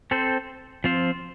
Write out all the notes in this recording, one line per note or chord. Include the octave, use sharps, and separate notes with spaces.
C4 A4 C5
F3 C4 F4 C5